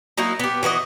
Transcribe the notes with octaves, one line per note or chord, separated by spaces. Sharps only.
F#3 A#3 D#4 E4
B3 G4
E3 F#4 A#4 D#5